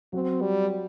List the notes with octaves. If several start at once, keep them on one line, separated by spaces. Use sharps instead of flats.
F#3 C4 F#4
G3